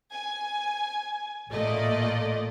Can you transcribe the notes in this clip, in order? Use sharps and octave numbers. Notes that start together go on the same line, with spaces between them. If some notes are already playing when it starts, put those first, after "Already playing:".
G#5
A1 A#2 A3 D5 D#5